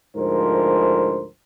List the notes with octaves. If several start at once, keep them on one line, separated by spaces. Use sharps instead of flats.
D2 G#2 F3 A#4 C5